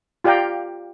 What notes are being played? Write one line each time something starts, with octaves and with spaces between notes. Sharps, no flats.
F4 G4 D5 F5 G5 A#5